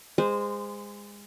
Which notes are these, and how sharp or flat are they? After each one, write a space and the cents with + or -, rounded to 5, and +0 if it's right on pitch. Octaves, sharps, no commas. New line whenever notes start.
G#3 -25 C5 -20